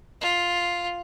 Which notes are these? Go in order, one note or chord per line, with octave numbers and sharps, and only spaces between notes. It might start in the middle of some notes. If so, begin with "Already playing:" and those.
F4